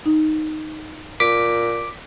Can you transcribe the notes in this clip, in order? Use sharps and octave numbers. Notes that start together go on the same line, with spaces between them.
D#4
A#2 D6 B6